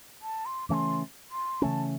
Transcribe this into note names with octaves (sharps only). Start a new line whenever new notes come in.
A5
C6
C#3 E3 A3 C#4 C6 D6
C6
C#3 E3 A3 C#4 A5